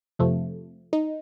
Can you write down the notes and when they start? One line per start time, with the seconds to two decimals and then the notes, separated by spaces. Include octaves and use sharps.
0.19 F2 C3 F3 A3
0.93 D#4